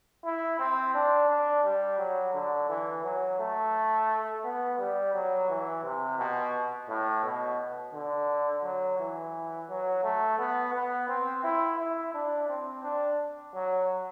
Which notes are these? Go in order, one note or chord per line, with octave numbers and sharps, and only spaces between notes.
E4
C4
D4
D4
G3
F#3
D3
E3
F#3
A3
B3
G3
F#3
E3
C3
B2
A2
B2
D3
F#3
E3
F#3
A3
B3
B3
C4
E4
E4
D4
C4
D4
F#3